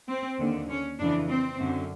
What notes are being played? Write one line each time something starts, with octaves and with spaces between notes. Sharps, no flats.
C4
D#2 D3
C#4
F2 C#3 E3 D4
C4
F#2 D3